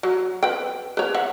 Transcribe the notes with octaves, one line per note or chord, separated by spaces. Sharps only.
F#3
B4 G5
B4 C#5
E5 F#5